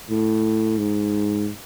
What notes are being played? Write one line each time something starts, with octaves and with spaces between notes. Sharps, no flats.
A2
G#2